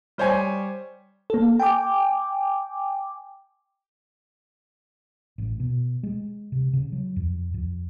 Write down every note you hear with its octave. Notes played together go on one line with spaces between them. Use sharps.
G3 C5 C#5 G#5
A#3 A4
G5 G#5 D6
A1
B2
G#3
C3
C#3
F#3
F2
F2